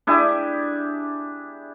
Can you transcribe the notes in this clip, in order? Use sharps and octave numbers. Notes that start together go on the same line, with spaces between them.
D4 E4 G4 G#4